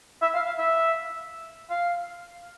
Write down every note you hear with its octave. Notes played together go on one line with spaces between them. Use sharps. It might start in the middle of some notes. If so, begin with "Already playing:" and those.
E5
F5
F5
E5
F5